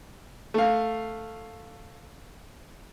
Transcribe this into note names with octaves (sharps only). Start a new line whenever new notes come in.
A3 F5